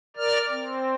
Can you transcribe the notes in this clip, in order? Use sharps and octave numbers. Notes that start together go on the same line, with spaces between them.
A#4 D5 F6
C4